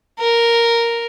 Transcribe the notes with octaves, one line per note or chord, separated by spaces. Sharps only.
A#4